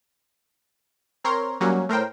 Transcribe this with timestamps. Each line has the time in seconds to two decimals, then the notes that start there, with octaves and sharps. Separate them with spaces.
1.24 C4 A#4 C#5 A#5 C6
1.61 F#3 G3 A#3 C#4 F#4
1.89 A2 A#4 C5 G5